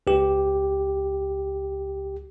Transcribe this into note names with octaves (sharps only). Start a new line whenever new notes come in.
C#2 G4